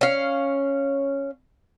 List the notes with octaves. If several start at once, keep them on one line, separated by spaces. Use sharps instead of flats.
C#4 F5